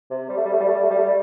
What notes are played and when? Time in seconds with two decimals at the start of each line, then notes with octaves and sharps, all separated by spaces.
0.11 C3
0.29 G3
0.37 A3
0.45 G3
0.53 A3
0.60 G3
0.68 A3
0.75 G3
0.83 A3
0.91 G3
0.98 A3
1.05 G3